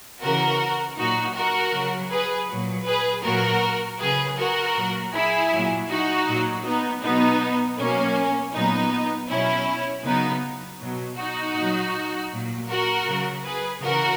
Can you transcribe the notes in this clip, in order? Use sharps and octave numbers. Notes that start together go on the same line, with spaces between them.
C#3 E3 F#4 A#4
A#2 F#3 D#4 F#4
F#4 A#4
C#3 F#3
G#4 B4
A#2 F#3
G#4 B4
A#2 F#3 F#4 A#4
C#3 F#3 G#4 B4
F#4 A#4
A#2 F#3
E4 G#4
A#2 F#3
D#4 F#4
A#2 F#3
B3 D#4
B2 F#3 B3 D#4
B2 F#3 A#3 C#4
A#2 F#3 B3 D#4
B2 F#3 C#4 E4
C#3 F#3 B3 D#4
B2 F#3
D#4 F#4
A#2 F#3
A#2 F#3
F#4 A#4
C#3 F#3
G#4 B4
C#3 E3 F#4 A#4